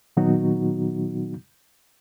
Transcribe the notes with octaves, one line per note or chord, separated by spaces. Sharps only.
A#2 D#3 F#3 B3 D#4 F#4